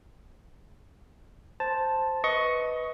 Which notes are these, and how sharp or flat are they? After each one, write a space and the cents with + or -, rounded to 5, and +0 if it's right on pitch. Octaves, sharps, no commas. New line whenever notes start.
C5 +0 A5 +0
B4 +0 D#5 +20 C#6 +0